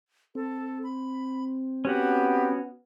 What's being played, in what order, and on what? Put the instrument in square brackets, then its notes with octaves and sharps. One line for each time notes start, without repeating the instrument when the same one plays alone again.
[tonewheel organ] C4 [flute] A4
[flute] B5
[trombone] B3 [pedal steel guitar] C#4 F#4 F#5 [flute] G4